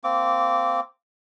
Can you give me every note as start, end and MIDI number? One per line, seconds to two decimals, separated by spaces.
0.04 0.80 58
0.04 0.80 60
0.04 0.80 86